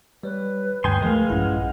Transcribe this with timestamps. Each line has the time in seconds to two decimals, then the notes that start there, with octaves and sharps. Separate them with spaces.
0.23 G3 B4 C#5
0.84 D2 G2 G5 G#5 C6 D#6
1.02 E2 F3 G#3 A3 A#4 B4 F5
1.30 A#1 G2 C#4 E4 F#5